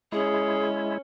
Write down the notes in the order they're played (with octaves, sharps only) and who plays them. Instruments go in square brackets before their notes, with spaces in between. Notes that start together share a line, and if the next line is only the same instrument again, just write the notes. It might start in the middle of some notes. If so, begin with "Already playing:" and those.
[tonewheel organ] G#3 E4 [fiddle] C#4 [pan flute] G#4